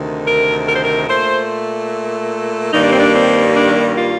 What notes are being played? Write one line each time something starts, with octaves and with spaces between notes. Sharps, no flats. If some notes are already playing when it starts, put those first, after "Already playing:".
Already playing: D2 C3 D#3
A#4
A#4
C5
A#4
A#2 A3 C5
G2 D#3 G3 A#3 D#4
D4
C4
D4
C4
D4
F4